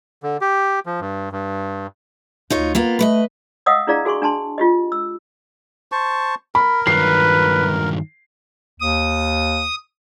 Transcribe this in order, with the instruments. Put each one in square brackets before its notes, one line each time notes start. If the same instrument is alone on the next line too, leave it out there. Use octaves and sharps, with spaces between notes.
[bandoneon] D3
G4
F3
G2
G2
[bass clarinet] D2 [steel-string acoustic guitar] D#4 F4 C#5
[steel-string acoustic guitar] A#3 B3 F4
[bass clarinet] A3 [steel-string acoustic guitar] B4 C#5 D#5
[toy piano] D#5 F5 F#5 D#6 E6
D4 E4 G#4 D5 F5 A#5
F#4 G#4 G#5 C6 C#6
D4 G#5 A5 C6
F4 G4 D#5
E6
[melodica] C5 A5 C#6
[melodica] A#4 [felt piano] B5
[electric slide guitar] G2 D#3 F#3 [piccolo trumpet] B4 [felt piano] C7
[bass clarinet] D#2 [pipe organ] D#6